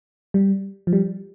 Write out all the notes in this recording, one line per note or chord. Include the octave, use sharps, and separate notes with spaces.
G3
F3
G3